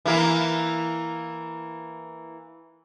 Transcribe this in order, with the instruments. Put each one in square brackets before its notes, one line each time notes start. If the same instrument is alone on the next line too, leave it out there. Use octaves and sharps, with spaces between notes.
[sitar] E3 A#3 E4